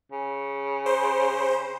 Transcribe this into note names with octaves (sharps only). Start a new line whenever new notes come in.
C#3
C5